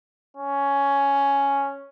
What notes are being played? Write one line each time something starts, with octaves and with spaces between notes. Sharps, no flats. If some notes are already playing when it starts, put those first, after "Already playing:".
C#4